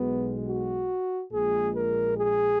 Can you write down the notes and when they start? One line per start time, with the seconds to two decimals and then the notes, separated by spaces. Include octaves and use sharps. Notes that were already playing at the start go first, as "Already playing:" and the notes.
Already playing: B1 B2 G#3 B3
0.47 F#4
1.32 A#1 A#2 G#3 G#4
1.75 A#4
2.17 G#4